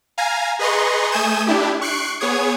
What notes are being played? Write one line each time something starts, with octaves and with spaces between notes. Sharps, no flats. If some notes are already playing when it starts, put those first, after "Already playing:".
F5 G#5 A#5
G#4 B4 D#5 A#5 C6 C#6
A3 G#5 D#6 G6 G#6 E7
D4 E4 G4
C#6 F#6 C7 D7
B3 G#4 C#5 D#6 G#6